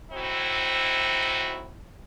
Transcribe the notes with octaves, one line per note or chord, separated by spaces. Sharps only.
A2 C4 D#4 E4 F#4